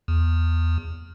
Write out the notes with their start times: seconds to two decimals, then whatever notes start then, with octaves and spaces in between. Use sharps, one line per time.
0.08 E2